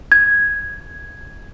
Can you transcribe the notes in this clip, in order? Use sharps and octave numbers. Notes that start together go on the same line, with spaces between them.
G#6